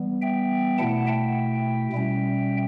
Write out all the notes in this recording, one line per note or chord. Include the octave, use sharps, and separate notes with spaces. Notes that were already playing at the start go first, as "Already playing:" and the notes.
Already playing: E3 G3 B3
E5 G5
B2 A3 E4 F#5 A5
E5 G5
B2 G3 C#4